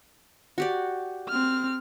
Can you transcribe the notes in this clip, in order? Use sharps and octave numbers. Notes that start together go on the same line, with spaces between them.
F#4 G4 D5
C4 F6